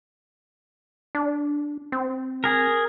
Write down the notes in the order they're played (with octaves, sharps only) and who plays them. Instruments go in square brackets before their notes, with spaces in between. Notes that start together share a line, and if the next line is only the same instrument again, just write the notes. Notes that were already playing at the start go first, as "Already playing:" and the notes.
[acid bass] D4
C4
[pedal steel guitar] G#4 A#4